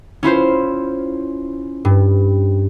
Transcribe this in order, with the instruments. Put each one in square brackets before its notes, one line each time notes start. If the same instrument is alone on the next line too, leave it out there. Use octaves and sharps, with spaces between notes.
[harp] C#4 E4 F4 C5
G2